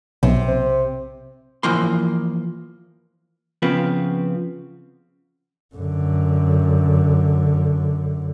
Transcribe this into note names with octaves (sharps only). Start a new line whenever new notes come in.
B1 C3
C4
E3 F3 A#3 C6
C#3 F3 B3 C4
F#2 D3